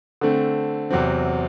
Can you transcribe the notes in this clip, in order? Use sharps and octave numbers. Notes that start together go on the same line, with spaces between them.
D3 A3 C4
E2 C3 F#3 C4